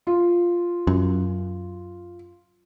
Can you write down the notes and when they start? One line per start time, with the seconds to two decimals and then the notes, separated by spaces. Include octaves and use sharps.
0.07 F4
0.87 F#2